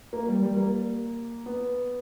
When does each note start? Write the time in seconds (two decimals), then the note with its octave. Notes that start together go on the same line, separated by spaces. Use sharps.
0.13 A#3
0.28 G3
0.43 G3
0.56 A#3
1.46 B3